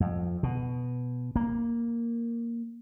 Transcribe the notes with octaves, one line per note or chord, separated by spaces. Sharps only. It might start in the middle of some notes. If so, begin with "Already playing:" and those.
F2
B2
A#3